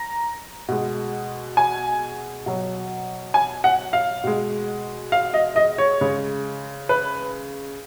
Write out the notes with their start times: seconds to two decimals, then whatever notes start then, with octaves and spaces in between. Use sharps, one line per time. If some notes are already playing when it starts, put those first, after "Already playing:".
Already playing: A#5
0.68 B2 G#3
1.57 G#5
2.46 B2 F#3
3.34 G#5
3.64 F#5
3.93 F5
4.24 B2 G#3
5.12 F5
5.34 D#5
5.56 D#5
5.78 C#5
6.01 C#3 G#3
6.89 B4